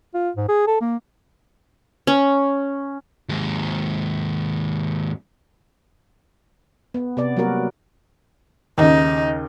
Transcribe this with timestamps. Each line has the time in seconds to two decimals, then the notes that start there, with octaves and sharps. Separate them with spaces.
0.14 F4
0.37 G#2
0.48 G#4
0.67 A4
0.81 A#3
2.07 C#4
3.29 D#2 G#2
6.94 B3
7.17 C3 B3 D5
7.37 F#3 G3 A#3 F#4 A#4
8.78 D#2 C#3 D#4